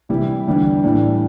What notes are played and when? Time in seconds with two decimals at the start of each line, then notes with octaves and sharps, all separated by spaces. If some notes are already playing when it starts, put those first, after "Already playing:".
0.09 C3 E3 G3 E4 G4
0.47 E2 D3 G3 D4
0.83 A2 E3 G3 D4